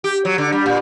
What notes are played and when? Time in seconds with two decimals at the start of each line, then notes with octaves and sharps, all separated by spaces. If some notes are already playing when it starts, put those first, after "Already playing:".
0.04 G4
0.25 F#3
0.38 D3
0.52 G3
0.66 A#2